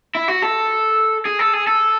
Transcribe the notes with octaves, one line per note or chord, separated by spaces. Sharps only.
E4
F#4
A4
G#4
A4
G#4
A4